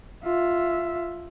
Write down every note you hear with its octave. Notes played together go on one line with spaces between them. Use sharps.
F4 E5